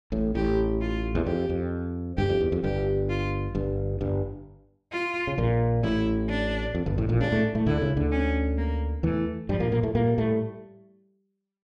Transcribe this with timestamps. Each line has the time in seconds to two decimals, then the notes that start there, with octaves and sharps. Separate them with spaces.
0.12 A1 A2
0.35 A1 A2 G4
0.81 F4
1.15 E2
1.26 F2 G4
1.49 F2
2.17 G1 G2 G4
2.29 F2
2.41 E2
2.52 F2
2.63 G1 G2 G4
3.09 F4
3.55 G1 G2
4.01 G1 G2
4.92 F4
5.27 C#3
5.38 A#1 A#2
5.83 A1 A2 E4
6.29 D4
6.75 F2
6.86 G1 G2
6.98 A1 A2
7.09 A#1 A#2
7.20 C#2 C#3 D4
7.32 A2 A3
7.55 A2 A3
7.66 D2 D3 E4
7.81 C#2 C#3
7.97 D2 D3
8.12 C#4
8.57 A#3
9.03 E2 E3 A3
9.49 G2 F3 G3
9.60 A#2 A#3
9.72 A#2 A#3
9.83 A2 A3
9.95 A#2 G3 A#3
10.18 A2 A3